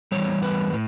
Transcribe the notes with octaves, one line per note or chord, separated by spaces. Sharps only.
E2 B2 G3 C#5
B4
A2